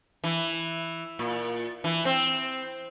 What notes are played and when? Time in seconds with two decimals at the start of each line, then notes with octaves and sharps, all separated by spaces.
0.24 E3
1.19 A#2
1.84 E3
2.05 C4